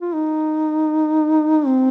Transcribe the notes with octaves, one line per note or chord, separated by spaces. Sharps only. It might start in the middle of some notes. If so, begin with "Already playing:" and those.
F4
D#4
C4